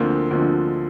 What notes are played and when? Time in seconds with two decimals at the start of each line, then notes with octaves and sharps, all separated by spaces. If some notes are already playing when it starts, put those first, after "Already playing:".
Already playing: D2 D3 F3 A#3 C4
0.31 D2 D3 F3 C4